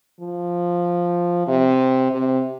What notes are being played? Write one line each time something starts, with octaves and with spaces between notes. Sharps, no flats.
F3
C3
C3